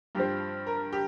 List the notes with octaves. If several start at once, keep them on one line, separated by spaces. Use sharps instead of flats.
G2 F3 C4 G4
A#4
G4